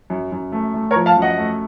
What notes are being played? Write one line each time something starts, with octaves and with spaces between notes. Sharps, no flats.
F#2
F#2
A3
A3
A#4 C#5
F3
F5 A5
F#2
D#5 F#5
A3